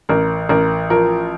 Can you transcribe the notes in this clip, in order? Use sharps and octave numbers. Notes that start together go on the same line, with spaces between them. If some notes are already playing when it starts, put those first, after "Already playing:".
A1 A#4
A1 A#4
F3 A#4